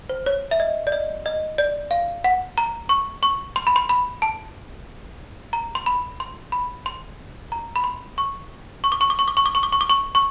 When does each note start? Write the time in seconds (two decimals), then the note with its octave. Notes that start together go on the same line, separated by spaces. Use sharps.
0.09 C5
0.26 C#5
0.51 E5
0.60 D#5
0.87 D5
0.92 D#5
1.26 D#5
1.58 D5
1.91 F5
2.24 F#5
2.58 A#5
2.89 C#6
3.23 C#6
3.56 C6
3.67 B5
3.76 C6
3.89 B5
4.22 A5
5.53 A#5
5.75 C6
5.86 B5
6.20 C6
6.52 B5
6.86 C6
7.52 A#5
7.76 B5
7.84 C6
8.18 C#6
8.84 C#6
8.92 D6
9.01 C#6
9.10 D6
9.19 C#6
9.28 D6
9.37 C#6
9.46 D6
9.55 C#6
9.63 D6
9.72 C#6
9.81 D6
9.90 C#6
10.15 C#6